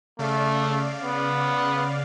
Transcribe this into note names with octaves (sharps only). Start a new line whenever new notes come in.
C#3 A3 D5 F5
B3